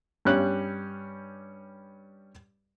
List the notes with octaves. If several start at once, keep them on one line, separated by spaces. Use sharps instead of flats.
G2 G3 C#4 F#6